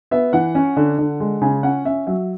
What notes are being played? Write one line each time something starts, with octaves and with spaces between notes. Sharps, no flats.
B3 E5
E3 F#5
C#4
D3
D3
G#3
C#3 G#5
C#4 F#5
C#4 E5
F#3 E5